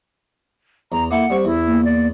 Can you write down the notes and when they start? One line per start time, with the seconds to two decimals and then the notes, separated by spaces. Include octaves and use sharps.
0.92 E2 A#5
1.11 A#3 E4 A4 F#5
1.30 G3 C4 C#6
1.45 E2 E4
1.67 A#3
1.85 D5